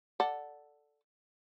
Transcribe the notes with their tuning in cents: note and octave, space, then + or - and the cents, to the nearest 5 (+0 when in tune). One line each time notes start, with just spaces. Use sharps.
A4 +0 D5 +0 F#5 +0